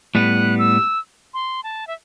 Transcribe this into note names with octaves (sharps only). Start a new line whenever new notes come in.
A2 G3 B3 F#6
E6
C6
A5
E5